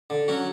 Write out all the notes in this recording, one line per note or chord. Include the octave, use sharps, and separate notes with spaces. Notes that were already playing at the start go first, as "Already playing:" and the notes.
D3
F#3 C#4 F#4